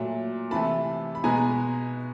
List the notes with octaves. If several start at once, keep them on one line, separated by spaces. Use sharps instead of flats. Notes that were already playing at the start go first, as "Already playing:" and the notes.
Already playing: A#2 F#3 A3
C3 E3 A3 A5 B5
B5
B2 G#3 B3 G#5 A#5